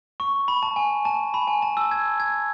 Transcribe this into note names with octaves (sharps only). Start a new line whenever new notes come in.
C#6
B5
A5
G#5
A5
B5
G#5
A5
E6
G#6
G#6